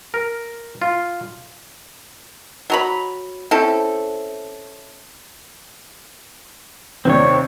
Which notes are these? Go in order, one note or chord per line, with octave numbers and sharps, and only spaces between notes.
A#4
F4
F#3 A#5 B5
C4 C#4 E4 A4
D#2 C3 C4 D4 C#5